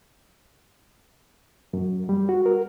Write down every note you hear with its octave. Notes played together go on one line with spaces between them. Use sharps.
F#2
G3
F#4
A#4